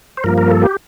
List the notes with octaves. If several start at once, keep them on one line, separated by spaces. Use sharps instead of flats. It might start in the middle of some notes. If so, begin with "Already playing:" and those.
C5
G2 F3 A#3 A#4
A#4
A4
G4